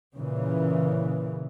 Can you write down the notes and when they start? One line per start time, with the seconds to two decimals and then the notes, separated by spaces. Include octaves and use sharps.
0.17 A#2 C#3 E3